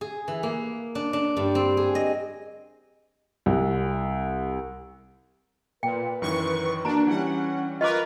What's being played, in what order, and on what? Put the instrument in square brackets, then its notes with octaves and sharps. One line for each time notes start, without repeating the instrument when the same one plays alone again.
[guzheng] G#4
E3
A#3
D4
D4
G2
C4
G#4
D#5
[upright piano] C2
[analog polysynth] A#2 [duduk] B4 [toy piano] G5
[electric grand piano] F#2 D#3 E3 [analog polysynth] C#6
[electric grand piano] A#3 F#4 D7 [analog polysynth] D4 [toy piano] A#5
[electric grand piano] E3 G3 [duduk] C#4 [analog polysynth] F#5
[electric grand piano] F4 C#6 F6 [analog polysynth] A#4 B4 [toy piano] D#5 D6